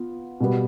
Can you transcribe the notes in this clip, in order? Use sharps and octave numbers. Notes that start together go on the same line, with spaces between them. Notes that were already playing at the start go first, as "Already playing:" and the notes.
Already playing: B3 F4
B2 G3 B3